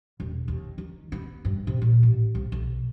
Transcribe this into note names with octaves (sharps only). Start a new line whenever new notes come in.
E1
D#2
D#3
B3
G2
C3
A#2
A1
C2
B1